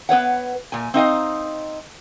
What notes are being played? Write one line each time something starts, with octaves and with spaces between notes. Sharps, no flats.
B3 B4 C#5 F#5
A#2 G#5
C4 D#4 D#5 F5